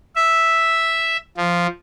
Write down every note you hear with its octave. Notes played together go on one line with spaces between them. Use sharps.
E5
F3